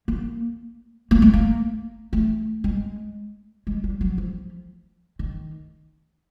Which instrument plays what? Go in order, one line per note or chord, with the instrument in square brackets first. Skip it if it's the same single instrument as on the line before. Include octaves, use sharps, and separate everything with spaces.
[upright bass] A#3
A#3
A3
A#3
A3
G#3
G#3
G3
F#3
F3
D#3